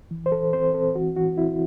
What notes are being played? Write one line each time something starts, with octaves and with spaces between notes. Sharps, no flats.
E3
C5
E3 A4
C4 C5
C4 A4
E3 F#4
E3 F#4
C4 E4